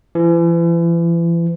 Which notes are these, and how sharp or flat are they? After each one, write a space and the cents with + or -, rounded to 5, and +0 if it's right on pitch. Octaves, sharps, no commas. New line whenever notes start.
E3 +40